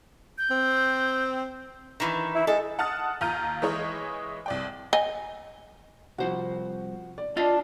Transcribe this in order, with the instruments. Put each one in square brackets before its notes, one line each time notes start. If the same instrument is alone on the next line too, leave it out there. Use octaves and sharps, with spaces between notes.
[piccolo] G6
[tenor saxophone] C4
[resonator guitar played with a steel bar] D#3 E3
[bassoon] E4
[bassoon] G#3 [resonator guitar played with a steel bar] A4
[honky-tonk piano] F#5 A5 D#6 F6 A6
D#2 F4 A#5 F6 G6 D#7
E3 G#3 E4 G#4 C#5 D#5
C2 D5 G5
[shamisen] D#5 G#5
[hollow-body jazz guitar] C2 C5 [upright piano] F3 F#4
[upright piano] D5
[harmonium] D4 [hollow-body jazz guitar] F4 D#5 [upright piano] A6 C7